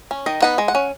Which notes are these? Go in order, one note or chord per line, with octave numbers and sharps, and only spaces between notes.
C#4
D#3 D#5
B3 D#4 F#5
G#3
F#5
C#4